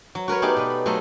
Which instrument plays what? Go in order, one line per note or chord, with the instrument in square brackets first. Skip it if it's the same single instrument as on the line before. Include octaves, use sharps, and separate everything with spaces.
[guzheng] F#3
F#4 A#4 B4 C#5
A3 B3 D#4 G4 G#4 D5
B2 B4
B5
F#3 A3 F4 A4 C5 D#5